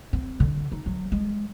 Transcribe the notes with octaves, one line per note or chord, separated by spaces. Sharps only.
C4
D3
D#4
F#3
G#3